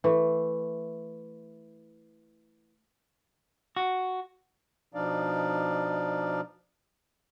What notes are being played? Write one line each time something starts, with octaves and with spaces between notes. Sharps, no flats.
E3 A3
F#4
B2 F3 D4 D#4 D5 F5